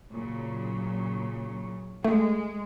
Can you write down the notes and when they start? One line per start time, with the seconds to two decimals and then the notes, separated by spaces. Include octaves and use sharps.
0.10 A#2 C#3 F#3
2.04 G#3 A3